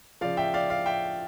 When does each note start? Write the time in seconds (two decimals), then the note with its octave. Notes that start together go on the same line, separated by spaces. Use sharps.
0.21 C#3 F3 D5 F5
0.37 E5 G5
0.54 D5 F5
0.70 D5 F5
0.86 E5 G5